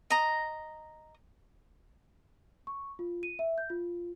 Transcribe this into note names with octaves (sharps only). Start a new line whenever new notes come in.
D#5 A#5
C#6
F4
D#7
E5
G6
F4